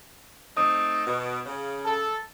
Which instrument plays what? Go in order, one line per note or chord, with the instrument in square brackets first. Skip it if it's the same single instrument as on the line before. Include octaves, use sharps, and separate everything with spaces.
[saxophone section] A3 C4 D#4 [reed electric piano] D#6
[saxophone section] B2
C#3
[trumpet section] A4